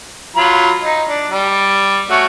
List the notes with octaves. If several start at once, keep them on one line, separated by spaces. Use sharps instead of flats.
F#3 F4 B5
D#4
D4
G3
A3 C#4 F#4